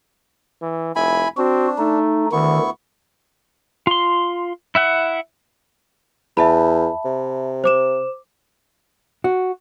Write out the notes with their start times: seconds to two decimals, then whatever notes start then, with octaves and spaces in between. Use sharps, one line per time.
0.62 E3
0.96 F1 E4 G#5 B5
1.37 C4 D4 F#4
1.79 A3 D#4
2.32 D2 D#3 B3 E4 C#6
3.87 F4 C6
4.75 E4 E5 F#5
6.37 E2 E5 A5 B5
7.05 C3
7.64 C5 D6 E7
9.24 F#4